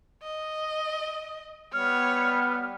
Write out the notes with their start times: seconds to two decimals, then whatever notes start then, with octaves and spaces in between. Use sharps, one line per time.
0.23 D#5
1.73 G3 B3 C#5 F6